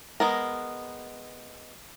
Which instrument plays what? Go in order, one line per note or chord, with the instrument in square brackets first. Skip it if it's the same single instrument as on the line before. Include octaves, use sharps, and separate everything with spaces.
[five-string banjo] G#3 B3 A#4